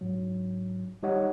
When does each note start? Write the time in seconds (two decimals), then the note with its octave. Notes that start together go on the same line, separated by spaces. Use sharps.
0.01 G#2 F#3
1.03 G3 D#4 G4 C#5 D#5 F#5